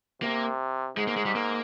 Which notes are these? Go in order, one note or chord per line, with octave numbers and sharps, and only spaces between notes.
C3 A#3
G#2 G#3
A#3
G#3
G3
A#3